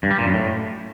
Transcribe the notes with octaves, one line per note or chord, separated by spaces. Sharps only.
G2
G3
A#2
F#2
A2